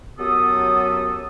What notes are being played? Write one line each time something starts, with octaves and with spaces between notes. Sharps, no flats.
F#2 F#3 B3 G4 A4 D#6